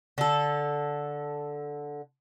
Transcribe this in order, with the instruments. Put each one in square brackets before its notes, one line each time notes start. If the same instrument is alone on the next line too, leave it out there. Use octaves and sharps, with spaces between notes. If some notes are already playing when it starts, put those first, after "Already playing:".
[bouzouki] D3 A4